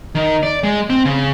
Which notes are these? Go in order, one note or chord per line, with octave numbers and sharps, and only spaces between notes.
D#3
D5
G#3
C4
C#3